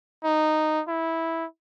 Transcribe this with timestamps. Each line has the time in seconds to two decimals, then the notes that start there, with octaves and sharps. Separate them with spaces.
0.24 D#4
0.88 E4